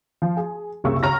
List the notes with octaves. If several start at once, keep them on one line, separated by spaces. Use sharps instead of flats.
F3
G#4
F#1 C2 C#3 A#3 C#6 E6
C#2 C#4 A#5 C#6 F6 A#6